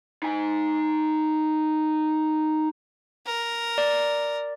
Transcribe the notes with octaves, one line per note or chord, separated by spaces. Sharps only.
D#4 G#5
A#4
D5